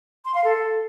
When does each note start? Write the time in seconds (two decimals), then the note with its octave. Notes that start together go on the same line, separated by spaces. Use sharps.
0.25 C6
0.35 F5
0.44 A4